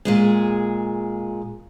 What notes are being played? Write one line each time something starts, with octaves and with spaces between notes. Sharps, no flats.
A#2 G#3 G#4